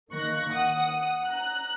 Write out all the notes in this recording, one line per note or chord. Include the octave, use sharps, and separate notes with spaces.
D#3 A#3 C#6 F#6 A#6
F#5 D#6
A#5 F#6